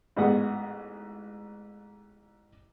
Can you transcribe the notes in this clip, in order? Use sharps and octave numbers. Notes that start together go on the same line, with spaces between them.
A1 G#2 B3 G#4 F#5